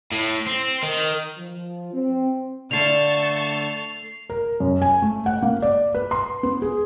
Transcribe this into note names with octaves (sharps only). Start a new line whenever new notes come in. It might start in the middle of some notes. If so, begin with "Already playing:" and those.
A2
C4
D#3
F3
C4
D3 A3 F4 A5 C#6 G6 C7 F7
A#4
F#2
G#5
A3
F#5
A#3
D5
B4
C6
B3
G#4